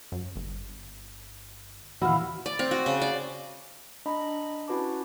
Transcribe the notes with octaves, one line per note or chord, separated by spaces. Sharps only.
F#2
G1
D#2 A#2 E3 E4 F#4 F5
D5
C4
F#4
C#3
D5
D4 D#5 A#5 B5
C#4 E4 F#4 B4 A5 D6